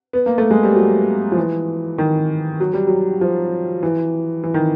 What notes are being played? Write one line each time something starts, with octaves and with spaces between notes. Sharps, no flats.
B3
A#3
A3
G#3
G3
F#3
F3
E3
D#3
F#3
G3
F#3
F3
E3
E3
D#3